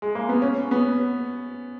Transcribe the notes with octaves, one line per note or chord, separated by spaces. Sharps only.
G#3
A#3
B3
C#4
B3